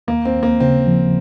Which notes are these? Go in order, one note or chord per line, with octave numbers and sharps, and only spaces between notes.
D#2 A#3
C4
D#2
A#3
C#3 C4
F3